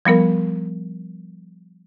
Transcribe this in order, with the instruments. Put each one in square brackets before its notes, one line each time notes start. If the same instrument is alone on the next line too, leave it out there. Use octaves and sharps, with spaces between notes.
[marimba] F3 G3 B3 A#4